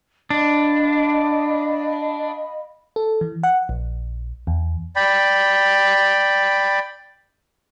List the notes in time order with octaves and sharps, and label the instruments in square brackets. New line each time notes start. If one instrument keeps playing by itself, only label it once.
[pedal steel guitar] D4 [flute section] D#5 F5 B5
[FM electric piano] A4
E3
F#5
A#1
E2
[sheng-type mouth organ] D5 G5 B5